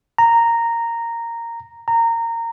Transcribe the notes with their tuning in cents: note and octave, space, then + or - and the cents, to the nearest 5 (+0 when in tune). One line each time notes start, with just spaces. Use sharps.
A#5 -10
A#5 -20